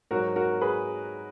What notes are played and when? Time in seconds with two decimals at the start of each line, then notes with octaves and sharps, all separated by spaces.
0.11 G#2 F#3 F#4 A#4
0.36 F#4 A#4
0.61 G#4 B4